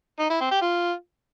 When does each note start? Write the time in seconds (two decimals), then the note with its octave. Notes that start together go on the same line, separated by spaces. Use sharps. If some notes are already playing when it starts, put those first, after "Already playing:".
0.20 D#4
0.30 E4
0.41 C4
0.51 G4
0.62 F4